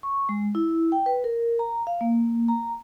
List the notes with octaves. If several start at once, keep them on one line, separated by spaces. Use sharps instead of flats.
C#6
G#3
E4
G5
B4
A#4
A#5
F5
A#3
A#5